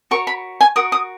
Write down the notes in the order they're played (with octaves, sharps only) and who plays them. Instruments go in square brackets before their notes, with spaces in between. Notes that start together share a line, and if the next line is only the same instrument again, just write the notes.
[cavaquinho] F#4 A#4 C#5 C#6
B5
G#5
F#4 A#4 D#6
D#6